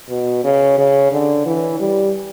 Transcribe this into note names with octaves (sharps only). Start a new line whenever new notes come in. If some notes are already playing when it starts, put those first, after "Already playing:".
B2
C#3
C#3
D3
E3
G3